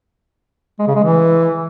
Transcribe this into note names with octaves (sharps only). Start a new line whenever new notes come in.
G#3
C#3
G#3
E3